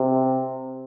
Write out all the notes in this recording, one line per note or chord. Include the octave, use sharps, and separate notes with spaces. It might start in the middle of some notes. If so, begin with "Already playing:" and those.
Already playing: C3